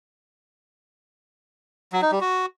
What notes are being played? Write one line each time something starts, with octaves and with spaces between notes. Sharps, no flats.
F#3
D#4
G3
F#4